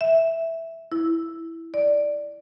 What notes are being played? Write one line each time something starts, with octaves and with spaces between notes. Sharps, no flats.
E5
E4
D5